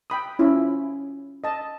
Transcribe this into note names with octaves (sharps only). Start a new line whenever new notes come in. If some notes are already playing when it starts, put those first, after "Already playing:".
G5 B5 D#6
C#4 E4 F4
D#5 A5